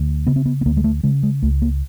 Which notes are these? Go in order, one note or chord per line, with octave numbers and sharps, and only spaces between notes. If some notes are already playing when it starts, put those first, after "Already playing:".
Already playing: D2
C#3 B3
C4
B3
B3
D2 A#3
G#3
A3
C#3 G#3
G#3
C#2 A3
A#3